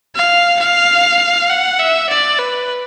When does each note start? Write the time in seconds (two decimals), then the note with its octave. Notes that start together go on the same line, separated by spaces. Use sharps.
0.15 F5
0.59 F5
1.50 F#5
1.79 E5
2.09 D5
2.39 B4